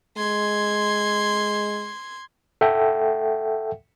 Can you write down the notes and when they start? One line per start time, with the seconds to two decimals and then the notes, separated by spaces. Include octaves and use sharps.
0.17 G#3 C6 G#6
2.61 A4 E5 F#5 G5